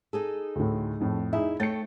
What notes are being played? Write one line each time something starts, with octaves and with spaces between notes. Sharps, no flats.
D#4 G#4 A4
D2 A2
F2 A2
D#4 E4 G#4 E5
A3 C#5 G5 A6 C#7